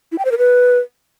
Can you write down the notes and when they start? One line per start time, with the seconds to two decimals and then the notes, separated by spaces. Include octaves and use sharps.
0.12 E4
0.18 G5
0.25 C5
0.31 A#4
0.38 B4